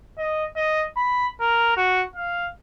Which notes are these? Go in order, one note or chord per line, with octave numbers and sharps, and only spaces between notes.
D#5
D#5
B5
A#4
F#4
F5